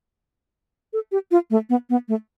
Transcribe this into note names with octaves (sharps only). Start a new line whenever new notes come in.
A4
G4
F4
A3
B3
B3
A3